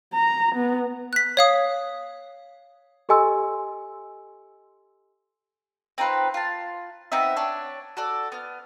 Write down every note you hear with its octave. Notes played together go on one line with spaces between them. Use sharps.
A#5
B3
F#6 B6
C#5 F5 D#6
G4 A4 D#5 G#5 C6 E6
C4 D#4 F4 B4
F4 A5
B3 C4 D#4 E5
D4 C#5
F#4 A4 D5
B3 F6